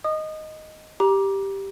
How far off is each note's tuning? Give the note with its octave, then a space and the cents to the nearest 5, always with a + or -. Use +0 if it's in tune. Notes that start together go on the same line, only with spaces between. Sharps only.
D#5 +0 D#6 -25
G4 +0 A#5 +30